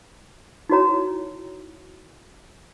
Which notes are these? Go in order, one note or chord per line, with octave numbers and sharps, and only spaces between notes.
D#4 E4 F#4 C#5 A#5